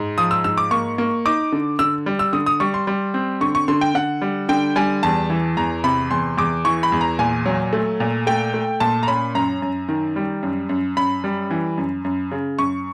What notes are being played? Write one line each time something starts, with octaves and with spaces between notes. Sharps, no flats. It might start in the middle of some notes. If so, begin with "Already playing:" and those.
Already playing: G#2
F3 D#6
E6
G#2 E6
D6
A#3 C#6
A#3
D#4 D6
D3
D3 E6
G3
E6
D3 D#6
D#6
G3 C#6
C6
G3
C4
D3 C#6
C#6
D3 C6
G5
D3 F#5
G3
D3 G5
G3 G#5
E2 A5
E3
E2 A#5
C3 B5
E2 C6
E2 D6
E3 C#6
B5
E2
A#5
A#2 G#5
F#3
A3
A#2
A3 G5
A3
A#2 A5
A#5
C#4 B5
F#2 A#5
F#2
D#3
G3
F#2
F#2
F#2 B5
G3
E3
F#2
F#2
C#3
F#2 C#6